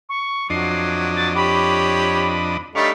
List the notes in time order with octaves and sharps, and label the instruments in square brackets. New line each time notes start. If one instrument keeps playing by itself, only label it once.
[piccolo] C#6
[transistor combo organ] F2 D4 D#5 [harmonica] F#3 [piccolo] C7
[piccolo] A6
[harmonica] G4 C#5 [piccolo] B5
[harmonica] G3 A3 D#4 [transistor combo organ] D4 C#5 F5 [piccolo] B6